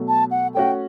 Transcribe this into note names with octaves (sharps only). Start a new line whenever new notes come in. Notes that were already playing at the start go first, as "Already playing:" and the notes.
Already playing: B2 F#3 A3
A5
F#5
A3 C#4 F#4 G5